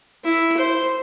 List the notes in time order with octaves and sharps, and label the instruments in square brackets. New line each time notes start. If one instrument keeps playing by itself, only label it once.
[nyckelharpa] E4
C5